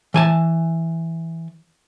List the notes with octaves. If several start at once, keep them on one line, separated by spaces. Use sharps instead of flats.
E3 G#5 A5